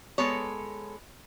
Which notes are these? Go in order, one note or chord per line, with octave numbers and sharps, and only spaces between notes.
G#3 B3 A4 C#5